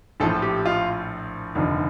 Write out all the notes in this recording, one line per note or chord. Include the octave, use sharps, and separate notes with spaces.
A#1 A2 F3 A4
G4
F4
F1 D#2 D3 F3